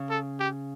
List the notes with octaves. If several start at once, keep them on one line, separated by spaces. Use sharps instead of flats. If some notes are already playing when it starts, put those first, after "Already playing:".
Already playing: C#3
A4
G4